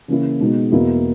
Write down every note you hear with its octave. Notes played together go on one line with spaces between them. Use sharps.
C#3 E3 A#3 C#4 E4
B2 G#3 D#4
E2 B2 A#3 E4